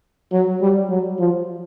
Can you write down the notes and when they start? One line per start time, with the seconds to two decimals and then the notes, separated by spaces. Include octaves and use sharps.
0.32 F#3
0.62 G3
0.90 F#3
1.19 F3